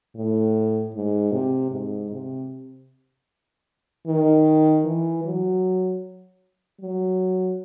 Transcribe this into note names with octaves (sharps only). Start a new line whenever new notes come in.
A2
G#2
C3
G#2
C3
D#3
E3
F#3
F#3